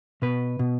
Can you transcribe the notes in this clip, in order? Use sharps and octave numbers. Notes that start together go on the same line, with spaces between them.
B2 B4
B2